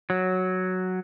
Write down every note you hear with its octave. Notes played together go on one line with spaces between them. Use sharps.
F#3